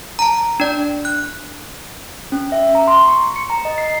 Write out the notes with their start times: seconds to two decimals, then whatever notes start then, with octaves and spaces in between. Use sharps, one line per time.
0.19 A5 A#5
0.60 D4 D5
1.05 F#6
2.32 C#4
2.52 E5
2.75 A#5
2.87 C6
3.08 C#6
3.36 C#7
3.50 A#5
3.65 D#5
3.78 C7